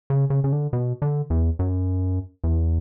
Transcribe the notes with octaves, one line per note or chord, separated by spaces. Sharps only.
C#3
C#3
C#3
D3
B2
D3
E2
F#2
E2